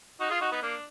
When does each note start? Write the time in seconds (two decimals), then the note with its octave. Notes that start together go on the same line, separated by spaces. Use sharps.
0.20 D#4 F#4
0.30 F4 G#4
0.41 D#4 F#4
0.51 B3 D#4
0.62 A#3 D4